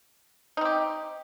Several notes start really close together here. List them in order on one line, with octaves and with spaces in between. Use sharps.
D#4 C4 G4